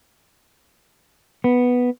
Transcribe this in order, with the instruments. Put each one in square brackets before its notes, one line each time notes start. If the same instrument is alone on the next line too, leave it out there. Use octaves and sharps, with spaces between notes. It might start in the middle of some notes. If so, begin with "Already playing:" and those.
[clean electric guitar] B3